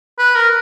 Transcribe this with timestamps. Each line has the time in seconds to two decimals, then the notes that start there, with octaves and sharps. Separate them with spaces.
0.19 B4
0.36 A#4